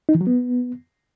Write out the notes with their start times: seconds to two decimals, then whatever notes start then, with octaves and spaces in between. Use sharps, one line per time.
0.09 D#4
0.15 E3
0.21 F#3
0.27 B3